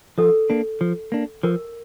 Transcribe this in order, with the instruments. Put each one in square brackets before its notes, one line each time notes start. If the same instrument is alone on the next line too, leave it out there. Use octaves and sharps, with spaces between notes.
[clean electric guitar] F3 [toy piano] A4
[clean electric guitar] A#3 D4
F3
A#3 D4
[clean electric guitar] F3 [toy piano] A#4